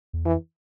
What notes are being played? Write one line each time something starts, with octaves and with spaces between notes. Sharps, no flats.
E2
F2 E3